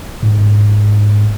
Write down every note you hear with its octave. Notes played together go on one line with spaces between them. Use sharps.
G#2